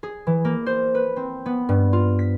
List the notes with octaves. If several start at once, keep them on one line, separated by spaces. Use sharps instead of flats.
G#4
E3
A#3
C5
B4
C4
B3
G2
F4
B6